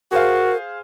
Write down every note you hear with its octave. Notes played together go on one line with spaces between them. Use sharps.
F#4 G#4 A#4 C5 F5